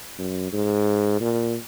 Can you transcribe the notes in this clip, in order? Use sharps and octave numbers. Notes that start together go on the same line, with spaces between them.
F#2
G#2
A#2